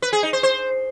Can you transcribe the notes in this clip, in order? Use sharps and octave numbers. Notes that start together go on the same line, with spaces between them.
B4
G#4
D#4
C5
C5